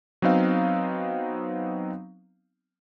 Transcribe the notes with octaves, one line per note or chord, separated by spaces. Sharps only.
F#3 B3 C4 D#4 F5